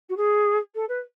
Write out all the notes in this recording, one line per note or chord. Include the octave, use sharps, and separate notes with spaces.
F#4
G#4
A4
B4